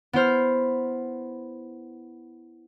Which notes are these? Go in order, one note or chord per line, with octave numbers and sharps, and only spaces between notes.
B3 E4 C5 F6